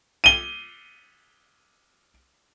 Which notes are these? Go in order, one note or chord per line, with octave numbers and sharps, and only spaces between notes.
D#7 G7